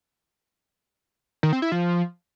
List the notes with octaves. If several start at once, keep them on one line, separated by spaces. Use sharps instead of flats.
D#3
C4
E4
F3